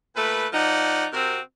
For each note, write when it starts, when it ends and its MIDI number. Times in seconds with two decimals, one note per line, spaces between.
0.15 0.45 46
0.15 0.45 57
0.15 0.45 71
0.53 1.05 53
0.53 1.05 63
0.53 1.05 74
0.53 1.05 78
1.12 1.38 48
1.12 1.38 60
1.12 1.38 66
1.12 1.38 70